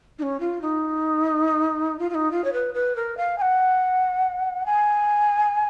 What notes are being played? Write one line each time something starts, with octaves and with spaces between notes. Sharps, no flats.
D#4
C#4
F4
D#4
F4
F4
D#4
F4
C#5
B4
B4
A#4
F5
G#5
F#5
G#5